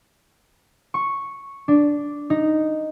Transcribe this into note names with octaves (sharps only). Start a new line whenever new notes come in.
C#6
D4
D#4